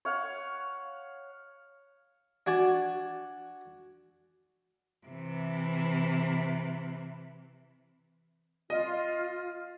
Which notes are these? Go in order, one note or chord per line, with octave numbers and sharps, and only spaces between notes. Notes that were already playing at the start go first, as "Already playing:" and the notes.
C#5 F5 F#5
D4 F#4 G#5 A5
C3 E3
F4 D#5